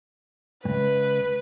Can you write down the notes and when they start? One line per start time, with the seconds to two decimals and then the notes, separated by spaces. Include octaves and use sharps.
0.65 C#2 G2 B4